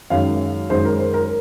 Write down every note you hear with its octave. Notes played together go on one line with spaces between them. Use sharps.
F#2 D#3 G#3 F5
F#2 D#3 G#3 C5
A#4
C5
A#4